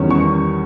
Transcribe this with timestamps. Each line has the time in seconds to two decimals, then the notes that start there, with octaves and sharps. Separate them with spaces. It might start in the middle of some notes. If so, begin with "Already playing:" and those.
Already playing: E2 D#3 G3 C#4
0.10 C#6